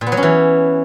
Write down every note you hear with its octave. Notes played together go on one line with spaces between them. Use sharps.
A#2
B3
F#3
C#4
E3